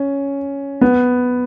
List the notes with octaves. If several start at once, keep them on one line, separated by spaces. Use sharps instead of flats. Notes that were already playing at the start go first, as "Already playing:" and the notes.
Already playing: C#4
B3